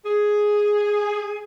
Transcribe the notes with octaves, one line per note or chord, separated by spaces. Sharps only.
G#4